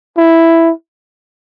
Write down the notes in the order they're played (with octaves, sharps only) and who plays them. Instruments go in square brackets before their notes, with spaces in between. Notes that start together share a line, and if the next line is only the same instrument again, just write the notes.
[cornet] E4